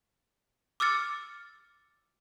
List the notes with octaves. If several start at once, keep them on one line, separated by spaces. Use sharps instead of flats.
D6 E6 F6 A6 C#7